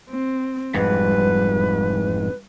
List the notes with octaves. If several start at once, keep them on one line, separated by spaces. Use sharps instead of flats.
C4
E1 F2 G#2 G3 B4